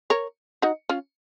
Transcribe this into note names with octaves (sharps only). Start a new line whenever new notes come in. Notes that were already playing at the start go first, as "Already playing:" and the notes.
A#4 C#5
D#4 F#4
C#4 F4